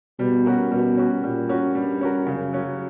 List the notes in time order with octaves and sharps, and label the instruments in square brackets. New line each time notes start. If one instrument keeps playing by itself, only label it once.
[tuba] B2 [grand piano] G3
[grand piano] C#4 F#4 A#4
[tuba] B2 [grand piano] G3
[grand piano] C#4 F#4 A#4
[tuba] A#2 [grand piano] G3
[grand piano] C#4 F#4 A#4
[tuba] G2 [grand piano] G3
[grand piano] C#4 F#4 A#4
[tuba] F#2 [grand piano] C#3
[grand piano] F#3 C#4